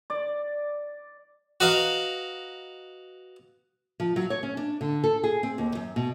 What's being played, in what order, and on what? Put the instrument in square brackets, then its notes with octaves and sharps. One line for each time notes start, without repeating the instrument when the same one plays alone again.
[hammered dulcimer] D5
[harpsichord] F#4 B4 D#5 F5 A#5
[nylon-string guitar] F3
F#3
C#5
C#4
D4
D3
A4
G#4
C4
D#2
F#2
B2